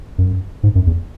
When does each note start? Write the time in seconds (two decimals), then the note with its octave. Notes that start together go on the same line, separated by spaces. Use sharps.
0.18 F#2
0.64 G#2
0.76 F#2
0.87 E2